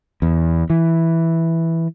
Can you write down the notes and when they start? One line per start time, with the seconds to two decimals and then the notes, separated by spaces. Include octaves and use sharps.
0.22 E2
0.70 E3